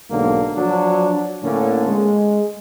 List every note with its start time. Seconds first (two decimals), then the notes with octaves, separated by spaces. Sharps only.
0.11 B1 G#2 D3 A#3
0.56 F3 F#3 D4
1.43 A2 D3 A#3 C#4
1.88 G#3